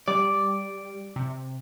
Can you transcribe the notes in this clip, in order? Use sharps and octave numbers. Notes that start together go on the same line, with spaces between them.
G3 D5
C3